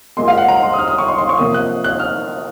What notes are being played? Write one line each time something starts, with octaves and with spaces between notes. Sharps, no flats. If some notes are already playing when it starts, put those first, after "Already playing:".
A#2 G#3 C6
F5
F#5
A#5
C6
D#6
F6
D#6
C#6
C6
C6
C#6
C3 F3 A#3 D#6
F#6
F#6
F6